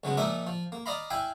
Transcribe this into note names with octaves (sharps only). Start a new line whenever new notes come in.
C#2 F#3 G#3 B3
A#2 F3 D#4 A#4 E5 D6
F3
A#3
D5 D#5 F5 A#5 B5
E4 E5 F5 G5 G#5